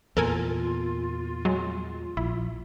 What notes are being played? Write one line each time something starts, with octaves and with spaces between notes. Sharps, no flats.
E2 A#2 F4 A4 A#4 G#5
F#3 G#3
A#1 E4